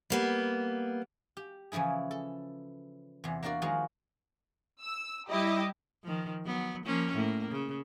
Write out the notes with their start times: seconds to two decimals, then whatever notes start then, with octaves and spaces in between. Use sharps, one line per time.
0.10 G3 A#3 B3
1.37 G4
1.72 C#3 E3 F3 E4 G#4
2.11 A4
3.24 E2 C3
3.43 A#3 D4 F#4 A#4 D5
3.62 D#3 F3 G#3 F#4 A#5
4.81 E6
5.30 G3 E4 G4 D#5
6.04 D#3 F3
6.46 F#3 B3
6.86 F3 A#3 C#4
7.14 A2 A#3
7.52 C#3